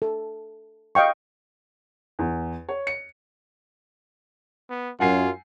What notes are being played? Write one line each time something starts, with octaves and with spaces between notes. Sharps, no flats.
A4
D#5 F5 G5 C#6
E2
C#5
C#7
B3
F#2 F4 F#5 G#5 C7